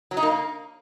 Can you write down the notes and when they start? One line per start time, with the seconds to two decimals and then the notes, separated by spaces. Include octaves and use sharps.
0.11 F#3
0.17 D#4
0.23 A#3